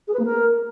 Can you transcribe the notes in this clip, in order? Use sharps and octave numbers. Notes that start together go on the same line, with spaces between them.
G#4
B4
A#3
A#4